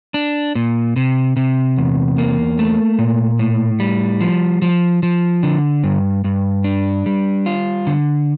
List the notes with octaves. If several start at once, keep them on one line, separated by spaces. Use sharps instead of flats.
D4
A#2
C3
C3
E2
A#3
A3
A#2
A2
G3
F3
F3
F3
D3
G2
G2
D4
G3
F4
D3